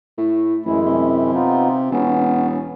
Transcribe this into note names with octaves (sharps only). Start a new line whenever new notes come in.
A2
A1 F#2 G#3 E4
C3
B3 D#4 F4
E1 B3 C#4